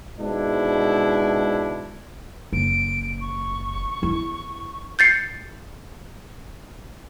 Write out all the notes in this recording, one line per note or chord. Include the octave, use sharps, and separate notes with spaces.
G#2 B2 D4 E4
F#1 D7
C#6
E2 E4
G6 A6 C7 C#7